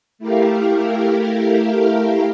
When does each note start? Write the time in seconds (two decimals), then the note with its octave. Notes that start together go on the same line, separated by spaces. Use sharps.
0.19 A3 E4 G4 A#4 F5